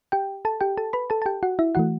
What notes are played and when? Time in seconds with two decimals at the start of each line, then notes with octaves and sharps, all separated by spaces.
0.12 G4 G5
0.45 A4 A5
0.61 G4 G5
0.77 A4 A5
0.93 B4 B5
1.10 A4 A5
1.22 A5
1.26 G4 G5
1.43 F#4 F#5
1.59 E4 E5
1.75 E3 A3 F#4 F#5